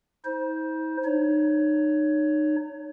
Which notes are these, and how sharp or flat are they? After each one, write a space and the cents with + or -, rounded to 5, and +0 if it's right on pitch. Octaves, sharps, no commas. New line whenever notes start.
D#4 +45 C5 +0
D#4 -30 C#5 +15